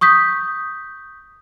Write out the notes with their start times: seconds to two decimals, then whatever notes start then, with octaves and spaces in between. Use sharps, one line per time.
0.01 C#6 D#6 G6 B6